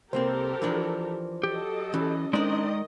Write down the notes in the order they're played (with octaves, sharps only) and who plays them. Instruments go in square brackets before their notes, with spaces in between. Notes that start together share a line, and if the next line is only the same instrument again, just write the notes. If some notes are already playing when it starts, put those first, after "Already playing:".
[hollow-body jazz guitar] C2 A#3 C4 [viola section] G4 A4 A#4 [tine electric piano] C5
[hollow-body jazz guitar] E3 F3 D4
[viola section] F#3 A4 D#5 [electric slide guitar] G4
[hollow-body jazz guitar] E3 [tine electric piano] C#4
[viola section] D#3 D#5 [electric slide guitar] G#3 D#4 D5 [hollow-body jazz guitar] D4 C5